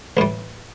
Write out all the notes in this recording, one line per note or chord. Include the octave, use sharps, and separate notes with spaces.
A1 A2 G3